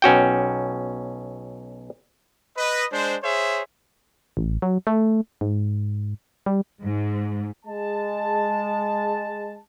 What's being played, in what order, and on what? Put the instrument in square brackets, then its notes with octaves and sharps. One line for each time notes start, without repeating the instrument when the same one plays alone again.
[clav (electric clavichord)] B1 C#4 F#4 G5
[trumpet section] B4 D#5
G#3 D4 C5
G#4 C5 C#5 E5
[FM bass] A1
F#3
A3
G#2
G3
[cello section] G#2
[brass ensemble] G#3 A5